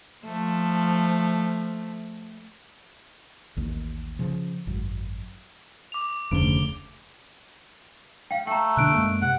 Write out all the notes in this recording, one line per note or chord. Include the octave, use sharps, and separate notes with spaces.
F3 A3
A1 D#2
C#3 F3
G#1 F#2
D6 F7
F1 D2 C#3 D7 G7
F5 G5
A3 G5 A#5
B2 D3 D4 F#6 D7
F#2 G#3 A#3
C3 F#5